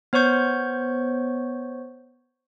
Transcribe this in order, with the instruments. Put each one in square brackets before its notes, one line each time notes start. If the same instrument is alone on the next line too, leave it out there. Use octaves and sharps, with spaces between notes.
[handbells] B3 C5 C#5 C#6 G6